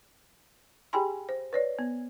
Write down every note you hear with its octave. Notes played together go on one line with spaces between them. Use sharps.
G4 G#4 G5 G#5 B5 C6
C5
B4 C#5 D5
B3